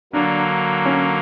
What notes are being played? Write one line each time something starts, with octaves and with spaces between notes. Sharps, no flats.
D3 F#3 A#3 D4
C#4